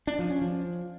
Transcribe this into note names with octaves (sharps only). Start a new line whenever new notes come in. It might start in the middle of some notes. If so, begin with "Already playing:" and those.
D4
F3
C#4
F3